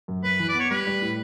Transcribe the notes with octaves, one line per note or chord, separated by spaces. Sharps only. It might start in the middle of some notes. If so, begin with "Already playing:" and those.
F#2
F#2 B4
E3
D5
B3
C#5
G3 B4
G3
A2